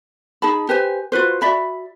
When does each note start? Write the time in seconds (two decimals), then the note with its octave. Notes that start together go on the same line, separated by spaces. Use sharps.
0.42 D#4 G#4 A5 B5
0.69 G4 B4 C5 G#5
1.12 F4 F#4 B4 C5
1.42 F#4 D5 E5 B5